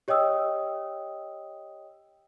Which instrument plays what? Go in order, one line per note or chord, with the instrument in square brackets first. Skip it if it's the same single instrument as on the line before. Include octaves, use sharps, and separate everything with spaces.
[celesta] G4 C#5 D#5 G5 D#6 E6